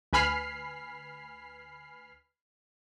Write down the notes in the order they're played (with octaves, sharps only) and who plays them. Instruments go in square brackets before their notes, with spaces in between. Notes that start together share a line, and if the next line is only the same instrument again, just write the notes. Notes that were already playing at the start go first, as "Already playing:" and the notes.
[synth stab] D2 B4 G#5 B5 F6 C7